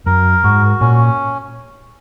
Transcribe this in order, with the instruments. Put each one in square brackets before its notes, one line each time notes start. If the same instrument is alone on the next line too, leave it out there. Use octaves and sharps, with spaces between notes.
[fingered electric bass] F#2 [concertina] A#4
[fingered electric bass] G#2 [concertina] F#4
[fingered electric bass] A#2 [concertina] C#4